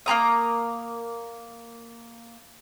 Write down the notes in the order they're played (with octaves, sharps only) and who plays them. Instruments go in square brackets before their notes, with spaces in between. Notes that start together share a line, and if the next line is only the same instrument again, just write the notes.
[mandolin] A#3 B3 A#5 D#6